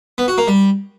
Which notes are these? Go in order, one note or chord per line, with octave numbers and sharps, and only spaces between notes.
B3
F#4
A#3
G3